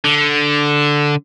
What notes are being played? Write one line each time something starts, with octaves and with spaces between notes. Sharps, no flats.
D3